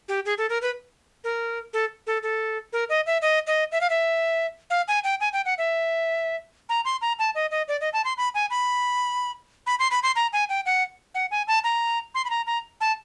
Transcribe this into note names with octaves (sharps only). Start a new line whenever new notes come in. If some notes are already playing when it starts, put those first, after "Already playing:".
G4
G#4
A4
A#4
B4
A#4
A4
A4
A4
A#4
D#5
E5
D#5
D#5
E5
F5
E5
F5
G#5
G5
G#5
G5
F#5
E5
A#5
C6
A#5
A5
D#5
D#5
D5
D#5
A5
C6
B5
G#5
B5
B5
C6
B5
C6
A#5
G#5
G5
F#5
F#5
G#5
A5
A#5
C6
B5
A#5
A#5
A5